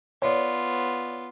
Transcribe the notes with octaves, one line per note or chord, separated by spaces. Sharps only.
B3 F4 C#5 D5